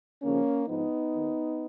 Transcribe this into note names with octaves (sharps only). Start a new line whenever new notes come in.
D#2 C#3 F3 A#3 C#4
G#2 F3 B3 D#4
D#2 D#3